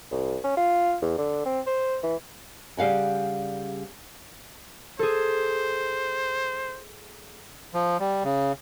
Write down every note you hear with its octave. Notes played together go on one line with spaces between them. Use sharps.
C2
C#4
F4
E2
D3
C4
C5
E3
C#3 G3 F5 F#5 G#5
G#4 A4 C5
F3
G3
C#3